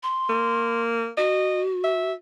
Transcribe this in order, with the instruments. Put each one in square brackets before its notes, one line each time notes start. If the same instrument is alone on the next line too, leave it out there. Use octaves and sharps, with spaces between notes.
[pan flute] C6
[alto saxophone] A#3
[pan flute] F#4 [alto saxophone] D#5
[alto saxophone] E5